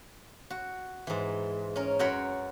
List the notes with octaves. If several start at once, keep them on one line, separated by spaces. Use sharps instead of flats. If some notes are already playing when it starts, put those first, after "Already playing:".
F#4
G#2 E3
C#4 A#4
F#2 F#4 A#4 C#5 B5 C6